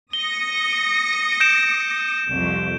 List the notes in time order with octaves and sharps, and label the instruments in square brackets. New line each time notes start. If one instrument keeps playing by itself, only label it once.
[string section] D#6 A#6 C#7 [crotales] G7
[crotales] G6 D7 E7
[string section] C2 F2